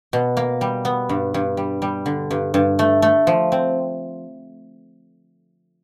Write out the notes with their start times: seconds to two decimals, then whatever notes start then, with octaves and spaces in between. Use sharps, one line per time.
0.13 B2
0.37 A#3
0.61 G3
0.85 B3
1.09 G2
1.34 G2
1.57 G3
1.82 G3
2.06 D3
2.31 G2
2.54 G2
2.79 A3
3.02 A3
3.27 F3
3.52 C4